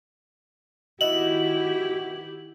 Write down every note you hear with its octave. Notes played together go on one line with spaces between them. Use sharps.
D#3 B3 E4 F#4 G4 D#5 E5 F#7